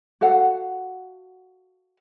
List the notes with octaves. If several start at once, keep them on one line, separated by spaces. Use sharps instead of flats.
F#4 A4 F5 F#5